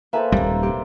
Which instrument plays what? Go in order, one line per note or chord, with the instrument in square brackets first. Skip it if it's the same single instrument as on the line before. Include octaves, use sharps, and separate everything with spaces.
[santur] A#3 A4 C5 [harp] B4 E5 G#5
[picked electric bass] D#1 G#1 [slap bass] G3
[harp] C3 G4